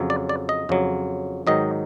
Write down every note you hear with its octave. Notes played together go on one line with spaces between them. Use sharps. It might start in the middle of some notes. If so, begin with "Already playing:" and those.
Already playing: F2 C#3 F#3
D5
D5
D#5
F2 C#3 F#3
G#2 D#3 F#3 D#5